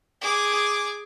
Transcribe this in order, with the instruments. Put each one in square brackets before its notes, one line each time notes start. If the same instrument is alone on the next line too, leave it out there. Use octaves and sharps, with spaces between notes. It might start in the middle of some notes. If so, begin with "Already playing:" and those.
[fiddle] G#4 D6